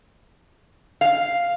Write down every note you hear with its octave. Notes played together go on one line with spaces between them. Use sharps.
F5